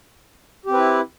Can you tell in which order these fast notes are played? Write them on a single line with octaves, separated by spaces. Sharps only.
G4 C4 B4 E4